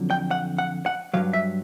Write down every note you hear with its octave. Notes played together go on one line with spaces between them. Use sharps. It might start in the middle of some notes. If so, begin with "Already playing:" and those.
Already playing: F2 D3 F#3
G5
F#5
F#5
F#5
G2 D#3 F#3 F5
E5